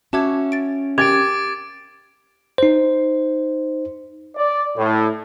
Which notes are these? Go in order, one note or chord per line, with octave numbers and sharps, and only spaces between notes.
C#4 F#4 E5 A5 D6 G#6
A6 D7
G4 A#4 G5 D6 G#6 A6 D7
D#4 C5
D5
A2